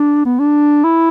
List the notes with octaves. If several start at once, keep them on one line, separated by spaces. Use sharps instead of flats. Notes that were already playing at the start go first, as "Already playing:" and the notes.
Already playing: D4
B3
D4
E4